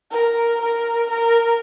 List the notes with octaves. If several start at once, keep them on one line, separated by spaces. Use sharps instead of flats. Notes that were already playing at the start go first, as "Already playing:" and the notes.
A#4
A#4
A#4